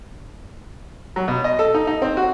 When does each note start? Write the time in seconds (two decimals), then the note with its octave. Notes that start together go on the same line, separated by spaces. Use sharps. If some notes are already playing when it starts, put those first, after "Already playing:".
1.16 F#3
1.28 B2
1.44 D#5
1.59 A4
1.74 D#4
1.87 D#4
2.02 C4
2.17 F#4